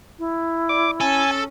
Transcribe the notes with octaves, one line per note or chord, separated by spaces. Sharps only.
E4
D5 D6
C#4 A4 G#5